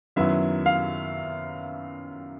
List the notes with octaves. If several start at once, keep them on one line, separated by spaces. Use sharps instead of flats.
F#2 D#3 F#3 B3 E4 E5
F5